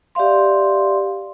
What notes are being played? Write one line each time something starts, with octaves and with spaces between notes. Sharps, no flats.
G4 D5 E5 F5 C6